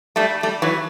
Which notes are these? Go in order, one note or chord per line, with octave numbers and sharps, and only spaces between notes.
G3 A3
G3 A3
E3 F#3